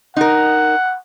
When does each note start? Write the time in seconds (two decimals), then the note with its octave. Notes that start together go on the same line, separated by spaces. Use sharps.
0.17 D#4 A#4 F#5